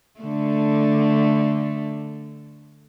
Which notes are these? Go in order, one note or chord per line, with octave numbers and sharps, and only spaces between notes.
D3 A3